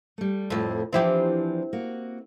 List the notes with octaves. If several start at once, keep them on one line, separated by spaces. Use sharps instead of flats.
G3 A3
F2 A2
E3 F3 C4 D4 E4 G4
A#3 F#4